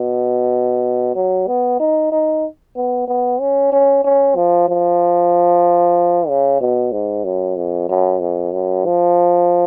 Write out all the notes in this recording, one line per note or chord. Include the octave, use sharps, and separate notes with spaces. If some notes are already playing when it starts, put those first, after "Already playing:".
Already playing: B2
F#3
B3
D#4
D#4
B3
B3
C#4
C#4
C#4
F3
F3
C#3
B2
G#2
F#2
F2
F#2
F2
F#2
F3